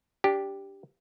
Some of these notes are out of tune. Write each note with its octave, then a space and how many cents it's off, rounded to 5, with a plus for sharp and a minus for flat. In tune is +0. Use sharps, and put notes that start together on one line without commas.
D4 -20 G4 +0